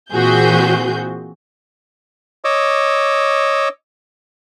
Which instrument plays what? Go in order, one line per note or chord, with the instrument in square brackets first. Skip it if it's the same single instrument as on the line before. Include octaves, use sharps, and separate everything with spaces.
[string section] A#2 E3 C4 F#4 G#4 G6
[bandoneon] C#5 D#5 D6 E6